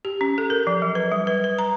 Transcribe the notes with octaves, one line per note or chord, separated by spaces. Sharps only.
G4
C#4
A4
A#4
F3
F#3
B4
G3
B4
B4
A#5